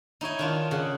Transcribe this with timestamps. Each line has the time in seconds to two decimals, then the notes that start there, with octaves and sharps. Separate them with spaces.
0.21 D#4 E4 C#5 G#5
0.39 D#3 D4 F4
0.71 C#3 F#5